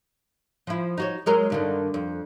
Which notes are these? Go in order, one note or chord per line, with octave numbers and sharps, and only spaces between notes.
F3 E4
D#4 F#4 C#5
F#3 G#3 A#4
G2 D3 D#3
F2